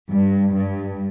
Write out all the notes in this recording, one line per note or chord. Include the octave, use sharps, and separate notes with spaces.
G2
G2